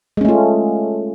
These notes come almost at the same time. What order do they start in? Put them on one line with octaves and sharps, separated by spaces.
G#3 C#4 A3 F4